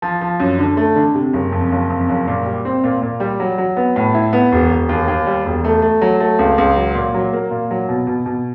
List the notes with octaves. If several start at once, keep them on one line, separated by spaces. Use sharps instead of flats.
F3
F3
F#2
D3
A3
D3
C3
F#1
F2
F#1
F2
F#1
A#2
G3
C4
A#2
A#2
G3
F#3
F#3
B3
A2
E4
B3
E1
E1
D#2
D#2
G3
E1
A3
A3
F#3
A3
C#2
C#2
F#3
A#2
F#3
A#3
A#2
F#3
B2
B2
B2